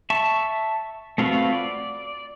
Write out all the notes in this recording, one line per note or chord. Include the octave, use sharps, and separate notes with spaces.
E5 A5 C#6
A3 C4 F4 F#4 B4
D5